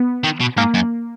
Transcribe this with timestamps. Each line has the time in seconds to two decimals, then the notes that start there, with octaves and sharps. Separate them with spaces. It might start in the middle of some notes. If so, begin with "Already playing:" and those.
Already playing: B3
0.24 D#3
0.40 B2
0.57 G#2 A#3
0.74 F#2